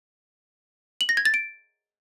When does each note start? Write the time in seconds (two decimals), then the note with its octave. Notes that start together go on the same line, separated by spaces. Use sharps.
1.01 F#7
1.09 A#6
1.17 G#6
1.25 A6
1.34 D7